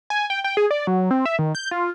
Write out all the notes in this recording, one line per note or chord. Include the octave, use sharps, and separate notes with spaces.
G#5
G5
G5
G#4
D5
F#3
C4
E5
D#3
G6
F4